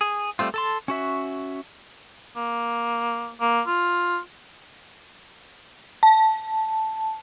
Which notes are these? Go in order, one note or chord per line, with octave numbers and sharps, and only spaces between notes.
G#4
G3 A3 C4 F4
A4 A5 C6
C#4 F#4 E5
A#3
A#3
F4
A5